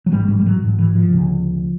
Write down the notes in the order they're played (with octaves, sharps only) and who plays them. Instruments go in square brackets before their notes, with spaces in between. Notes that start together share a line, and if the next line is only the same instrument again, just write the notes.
[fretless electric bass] F#3
A1 G#2 G3
G3
G3
F#3
A1 G#2
E3
F3
D2 C#3